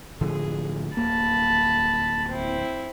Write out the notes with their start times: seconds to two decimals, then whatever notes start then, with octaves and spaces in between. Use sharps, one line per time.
0.21 A2 D3 F3 G#4
0.96 D1 A#3 A5 B5
2.29 C4 E4